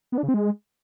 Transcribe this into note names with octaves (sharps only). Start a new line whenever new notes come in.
B3
D4
C#3
C4
G#3